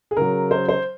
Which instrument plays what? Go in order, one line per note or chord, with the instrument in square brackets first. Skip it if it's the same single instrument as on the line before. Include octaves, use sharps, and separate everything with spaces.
[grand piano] G#4
C#3 F#3 A#4
C5
C5